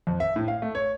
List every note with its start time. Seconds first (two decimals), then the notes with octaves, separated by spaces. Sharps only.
0.07 F2
0.20 E5
0.36 A2
0.48 F5
0.62 A3
0.75 C#5